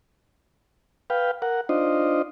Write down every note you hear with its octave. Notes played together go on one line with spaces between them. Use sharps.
B4 F5 G5
A#4 F#5
D4 D#4 F4 C5 D#5